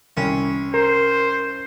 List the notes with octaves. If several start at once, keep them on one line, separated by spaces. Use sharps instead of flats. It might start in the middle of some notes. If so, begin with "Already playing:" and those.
C2 C#4
A#4 C5